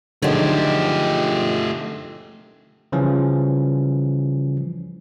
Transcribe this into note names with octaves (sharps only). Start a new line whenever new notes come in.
D3 D#3 F3 F#3 G#3 A3 G4
C#3 E3 F3 G3 C#4